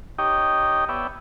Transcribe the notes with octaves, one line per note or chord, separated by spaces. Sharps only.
D#4 G4 C#5 D#5 G5
B3 C#5 D5 E5 G5